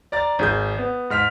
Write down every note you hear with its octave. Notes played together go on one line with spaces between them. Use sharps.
D5 A#5 A6
G#1 G#4 G6
B3
G#2 F6 B6 F7